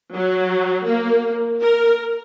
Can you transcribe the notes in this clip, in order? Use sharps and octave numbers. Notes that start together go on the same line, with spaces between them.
F#3
A#3
A#4